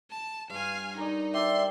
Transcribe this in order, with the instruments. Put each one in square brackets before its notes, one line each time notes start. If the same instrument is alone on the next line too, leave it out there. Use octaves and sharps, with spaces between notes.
[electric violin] A5
[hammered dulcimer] G2 [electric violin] F5 G#5
[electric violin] D#4 [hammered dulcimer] A#4 D5
[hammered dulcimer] G4 C5 [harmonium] D5 E5 [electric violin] C6